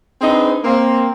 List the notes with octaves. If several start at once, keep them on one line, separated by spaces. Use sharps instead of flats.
C4 D4 D#4 G#4 B4 C5
A#3 C4